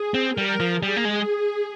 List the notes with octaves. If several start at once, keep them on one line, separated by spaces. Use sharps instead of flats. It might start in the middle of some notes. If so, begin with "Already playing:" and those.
Already playing: G#4
C4
G3 A#4
F3
G3 G#4
A#3
G#3